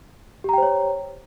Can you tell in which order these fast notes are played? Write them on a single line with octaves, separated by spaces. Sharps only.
G4 A#5 G5 C5 C#5